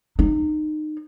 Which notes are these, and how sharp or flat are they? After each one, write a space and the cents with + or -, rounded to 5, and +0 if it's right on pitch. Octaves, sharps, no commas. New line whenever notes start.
D#4 -25